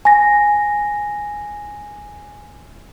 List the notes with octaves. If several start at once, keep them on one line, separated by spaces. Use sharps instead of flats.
G#5 A#6